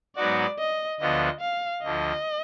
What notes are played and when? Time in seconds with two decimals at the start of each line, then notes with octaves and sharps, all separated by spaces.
0.16 G#2 F#3 B3 D#4 F#4 D5
0.59 D#5
1.00 D2 D3 F3 B3 F4 D#5
1.41 F5
1.83 D2 D3 F3 D#5